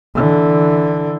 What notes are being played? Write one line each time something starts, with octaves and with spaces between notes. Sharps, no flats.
D3 E3